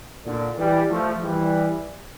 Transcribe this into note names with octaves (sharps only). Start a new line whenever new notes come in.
A#2 D3
E3 G3
F3 A3
E3 G3